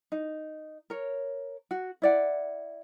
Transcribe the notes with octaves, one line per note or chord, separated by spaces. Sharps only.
D#4
A#4 C#5
F#4
E4 D5 F#5